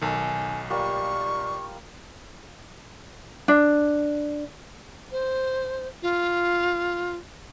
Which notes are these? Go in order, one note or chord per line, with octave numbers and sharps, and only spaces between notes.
B1 D#3 A4 G#5
G3 A#3 F4 D5 C#6
D4
C5
F4